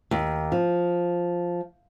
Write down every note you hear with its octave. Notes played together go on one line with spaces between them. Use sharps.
D#2
F3